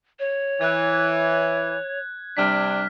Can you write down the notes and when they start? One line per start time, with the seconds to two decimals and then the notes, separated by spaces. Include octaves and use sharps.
0.19 C#5
0.61 E3 F#6 G#6
2.37 C3 G3 D4 F6 B6